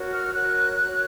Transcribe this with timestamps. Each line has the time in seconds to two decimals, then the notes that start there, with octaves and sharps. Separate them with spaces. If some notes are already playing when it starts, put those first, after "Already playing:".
Already playing: F#4 A#4 C#5
0.11 F6
0.34 F#4 A#4 C#5 F#6
0.81 F#4 A#4 C#5